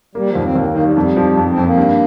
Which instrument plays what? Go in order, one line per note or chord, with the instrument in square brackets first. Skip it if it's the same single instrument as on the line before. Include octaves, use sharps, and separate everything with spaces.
[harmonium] G3 [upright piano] A#3
[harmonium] F3
[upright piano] D#2
[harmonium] C4
[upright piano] D#2 [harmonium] A#3
[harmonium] A#3
[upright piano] D#3
[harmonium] G3
[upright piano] F2 [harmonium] G3
[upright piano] F3
F2
[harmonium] C4
[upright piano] F2
[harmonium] A#3
[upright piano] G2